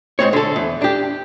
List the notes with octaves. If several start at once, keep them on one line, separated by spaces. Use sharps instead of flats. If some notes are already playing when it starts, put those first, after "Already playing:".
G#2 B2 C4 C#5
D3 A4
E2
D4 G4